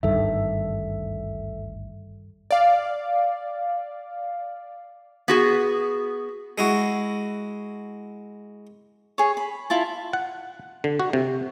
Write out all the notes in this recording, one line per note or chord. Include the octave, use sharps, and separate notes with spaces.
G#1 D2 G2 D#3 A4 E5
D5 F5
B3 F#4 G#4
G#3 E4 F#4
G#4 C#5
B5
E4 F4 A5
F#5
D3
F#4
C3